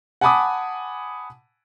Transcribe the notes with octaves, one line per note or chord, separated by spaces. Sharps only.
F#5 G#5 A5 B5 D6 D#6